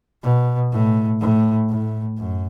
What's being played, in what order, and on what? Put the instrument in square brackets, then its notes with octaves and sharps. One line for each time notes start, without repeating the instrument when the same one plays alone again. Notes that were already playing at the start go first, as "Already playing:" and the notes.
[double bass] B2
A2
A2
A2
F#2